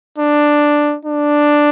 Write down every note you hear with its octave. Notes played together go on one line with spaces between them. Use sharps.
D4
D4